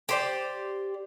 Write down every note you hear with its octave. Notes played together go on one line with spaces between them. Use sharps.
G4 C5 D5